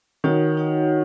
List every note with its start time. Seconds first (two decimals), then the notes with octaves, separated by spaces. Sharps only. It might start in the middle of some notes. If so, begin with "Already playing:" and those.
0.24 D#3 D#4 F#4 C#5 F#5
0.57 D#4 F#4 C#5 F#5